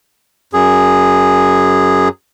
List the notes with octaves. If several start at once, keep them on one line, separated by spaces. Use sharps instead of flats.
F#2 G#4